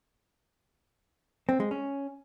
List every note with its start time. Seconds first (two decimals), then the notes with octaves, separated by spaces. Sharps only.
1.49 C4
1.60 G#3
1.71 C#4